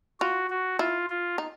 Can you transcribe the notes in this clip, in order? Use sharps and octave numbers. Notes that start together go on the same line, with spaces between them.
F4 F#4
F#4
E4 F4
F4
D#4